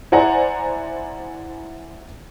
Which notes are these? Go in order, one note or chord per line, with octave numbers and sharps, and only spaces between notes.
E4 C5 D5 F#5 G#5 A#5